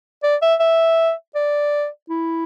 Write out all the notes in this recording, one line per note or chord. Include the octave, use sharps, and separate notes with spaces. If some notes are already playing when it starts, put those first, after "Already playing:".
D5
E5
E5
D5
E4